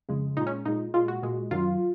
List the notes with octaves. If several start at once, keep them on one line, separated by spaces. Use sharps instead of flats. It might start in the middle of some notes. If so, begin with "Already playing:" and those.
F2 C#3 G#3
A#2 G#3 D#4
C#4
A#2 G#3 D#4
A#2 G#3 F4
F#4
A#2 G#3
F#2 D#3 F#3 F4